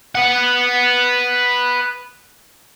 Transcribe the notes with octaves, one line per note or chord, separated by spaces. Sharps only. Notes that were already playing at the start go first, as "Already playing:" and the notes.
B4 F#5